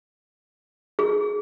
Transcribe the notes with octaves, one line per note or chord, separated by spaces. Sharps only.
G#4